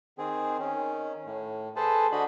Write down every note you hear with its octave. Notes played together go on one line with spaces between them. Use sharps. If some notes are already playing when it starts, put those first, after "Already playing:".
D#3 C4 G#4
D#3 C#4
A2
G#4 A4 B4 C5 A5
D3 D4 F#4 D#5 B5